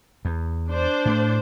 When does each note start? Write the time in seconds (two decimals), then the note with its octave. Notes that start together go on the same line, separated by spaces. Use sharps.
0.25 E2
0.70 D4 C5 D5
1.05 A2 A3